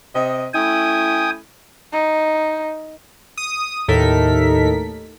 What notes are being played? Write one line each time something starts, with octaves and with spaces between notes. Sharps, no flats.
C3 D#5
A3 C#4 E4 G5 G#5 D#6
D#4
D#6
D#2 A2 D#4 A4 A#4 B6